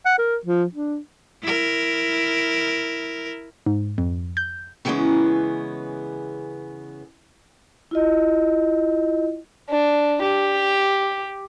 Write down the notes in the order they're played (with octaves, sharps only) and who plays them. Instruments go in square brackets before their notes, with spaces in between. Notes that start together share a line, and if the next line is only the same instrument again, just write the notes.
[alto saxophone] F#5
A#4
F3
D4
[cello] E4 A#4
[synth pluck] G#2
F2
G6
[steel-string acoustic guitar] C#3 E3 G3 G#3 B3 C#4
[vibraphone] E4 F4 D#5
[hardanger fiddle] D4
G4